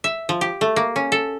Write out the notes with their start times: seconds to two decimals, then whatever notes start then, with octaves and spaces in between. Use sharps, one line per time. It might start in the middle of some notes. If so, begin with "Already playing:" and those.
0.04 E5
0.29 F3
0.41 G4
0.61 A3
0.76 A#3
0.96 C#4
1.12 A4